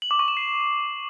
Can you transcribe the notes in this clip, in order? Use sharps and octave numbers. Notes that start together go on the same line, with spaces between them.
F#7
D6
C#6
E7
C7